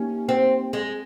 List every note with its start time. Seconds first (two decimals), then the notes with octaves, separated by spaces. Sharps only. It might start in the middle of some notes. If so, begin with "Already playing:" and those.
Already playing: A#3 C#4 D#4 G4
0.29 C4
0.73 G#3